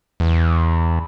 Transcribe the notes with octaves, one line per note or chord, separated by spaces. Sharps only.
E2